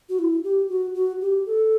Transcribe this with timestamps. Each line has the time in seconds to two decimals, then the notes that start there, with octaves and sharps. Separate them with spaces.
0.09 F#4
0.19 E4
0.44 G4
0.69 F#4
0.95 F#4
1.21 G4
1.46 A4